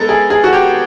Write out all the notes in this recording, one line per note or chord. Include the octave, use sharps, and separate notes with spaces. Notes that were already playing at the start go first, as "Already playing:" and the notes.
Already playing: G#3 B3 A4 A#4
G#4
G#4
F#4
G4